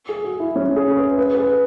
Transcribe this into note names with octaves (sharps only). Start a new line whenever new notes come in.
G#4
F#4
E4
C#4
G#4
B4
B4
B4
G#4